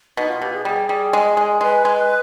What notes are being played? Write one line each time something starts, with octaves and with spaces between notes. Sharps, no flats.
B2 D#4
F4
B2 G4
G#4
G3 G#4
G3
G#3
G#3
G#3 B4
G#3